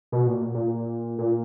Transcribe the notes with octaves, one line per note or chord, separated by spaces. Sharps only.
B2
A#2
A#2
A#2